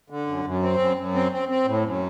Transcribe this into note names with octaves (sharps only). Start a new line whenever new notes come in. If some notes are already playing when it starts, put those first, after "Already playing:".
D3
F#2
F#2
C4
F#2
F#2
C4
C4
C4
A2
F#2